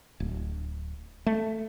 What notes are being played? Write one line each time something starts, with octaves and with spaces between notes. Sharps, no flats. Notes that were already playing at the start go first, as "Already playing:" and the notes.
D1
A3